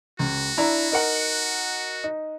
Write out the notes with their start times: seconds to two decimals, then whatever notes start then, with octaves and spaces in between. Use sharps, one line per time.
0.19 C#2 F#4
0.57 D4 E4 A#5
0.92 D#4 A#4 F#5
2.04 D#4